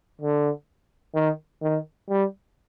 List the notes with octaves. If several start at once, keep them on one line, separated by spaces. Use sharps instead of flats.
D3
D#3
D#3
G3